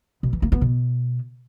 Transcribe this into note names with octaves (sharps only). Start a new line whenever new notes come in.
B2
E3
A#3
B3
B2